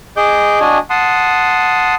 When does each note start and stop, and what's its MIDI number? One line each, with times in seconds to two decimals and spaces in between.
0.17 0.59 68
0.17 0.59 75
0.17 0.59 86
0.17 0.59 91
0.60 0.79 62
0.60 0.79 66
0.60 0.79 75
0.60 0.79 80
0.90 1.95 78
0.90 1.95 81
0.90 1.95 84
0.90 1.95 87